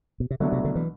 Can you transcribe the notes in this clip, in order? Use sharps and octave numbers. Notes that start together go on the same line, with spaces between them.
B2
C3
C2 B2 D3 F#3 A3 D4
C3
D3
E3